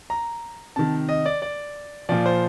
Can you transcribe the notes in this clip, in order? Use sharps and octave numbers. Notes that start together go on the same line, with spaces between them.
A#5
C3 D#3 A5
D#5
D5
D5
A#2 F3 D5
C5